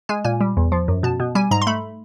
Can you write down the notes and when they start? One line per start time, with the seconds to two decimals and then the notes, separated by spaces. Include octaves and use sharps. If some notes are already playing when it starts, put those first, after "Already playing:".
0.09 G#3 G#5
0.25 A#2 G#5
0.41 G3
0.57 E2
0.72 F3
0.88 F#2
1.03 B2 A5
1.20 B2
1.35 G3 G#5
1.51 G#2 A#5
1.62 C6
1.67 A3 B5